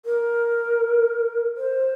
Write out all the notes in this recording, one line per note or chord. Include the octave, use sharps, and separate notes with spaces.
A#4
C5